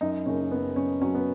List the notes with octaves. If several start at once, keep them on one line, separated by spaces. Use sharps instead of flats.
F#2 D#4
F#1 C#4
F#1 B3
F#2 C#4
F#3 C#4
B3